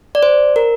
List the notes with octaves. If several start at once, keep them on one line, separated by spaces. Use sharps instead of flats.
D5
C5
A#4